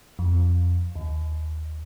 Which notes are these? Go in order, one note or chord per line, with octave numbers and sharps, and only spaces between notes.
F2
D#2